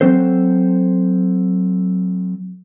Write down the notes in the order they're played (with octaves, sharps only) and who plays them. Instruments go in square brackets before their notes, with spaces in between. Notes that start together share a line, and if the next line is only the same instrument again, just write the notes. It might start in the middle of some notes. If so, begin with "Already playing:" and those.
[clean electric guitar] F#3 C4 A4 C5